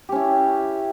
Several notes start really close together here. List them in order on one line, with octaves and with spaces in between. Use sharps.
G4 C#4 E4